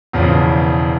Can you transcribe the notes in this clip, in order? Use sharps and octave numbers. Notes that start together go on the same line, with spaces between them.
E1 E2 C#3 F3